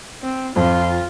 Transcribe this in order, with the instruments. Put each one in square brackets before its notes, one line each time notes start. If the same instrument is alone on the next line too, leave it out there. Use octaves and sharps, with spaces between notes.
[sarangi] C4
[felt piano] F2 [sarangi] F4